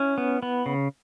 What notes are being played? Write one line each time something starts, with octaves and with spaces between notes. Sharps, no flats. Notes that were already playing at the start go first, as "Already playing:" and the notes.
Already playing: C#4 E4
B3
B3
C#3